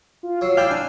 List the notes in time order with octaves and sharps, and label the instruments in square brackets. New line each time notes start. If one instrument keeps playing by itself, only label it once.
[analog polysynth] F4
[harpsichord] F#3 [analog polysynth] E6 C7
[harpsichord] E4 D5 [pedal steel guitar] F5 G5
[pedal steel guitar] D4 [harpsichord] G#5